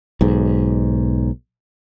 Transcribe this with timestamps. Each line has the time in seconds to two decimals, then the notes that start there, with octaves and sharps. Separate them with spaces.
0.21 B1 G#2